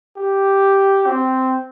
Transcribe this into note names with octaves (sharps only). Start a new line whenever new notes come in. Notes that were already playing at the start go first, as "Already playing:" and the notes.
G4
C4